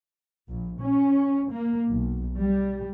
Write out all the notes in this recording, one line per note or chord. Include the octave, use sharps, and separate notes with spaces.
A#1
C#4
A#3
B1
G3